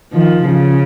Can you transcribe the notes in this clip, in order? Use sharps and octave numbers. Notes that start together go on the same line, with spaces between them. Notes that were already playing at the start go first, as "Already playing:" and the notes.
D#3 F3
C#3